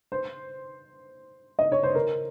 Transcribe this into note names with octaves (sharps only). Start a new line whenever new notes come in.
C5
D#5
C#5
C5
A#4